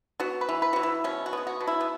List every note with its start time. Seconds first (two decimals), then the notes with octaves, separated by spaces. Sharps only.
0.20 B3 F#4
0.41 B4
0.49 E3
0.62 B4
0.73 E3 F#4
0.83 E4
1.04 B2 C#4
1.26 F#4
1.33 B3 G#4
1.47 F#4
1.61 B2
1.67 E4
1.81 B3